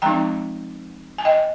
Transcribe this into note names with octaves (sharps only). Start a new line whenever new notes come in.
F3 G#3 C4 D#4 G5 A#5
G#5
D#5 G5